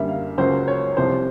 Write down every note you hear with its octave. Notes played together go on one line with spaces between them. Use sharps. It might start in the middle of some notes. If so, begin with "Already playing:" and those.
Already playing: F#2 D3 G3 A#3 E5
F5
C#2 C#3 F#3 A#3 C5
C#5
C2 C3 F3 C5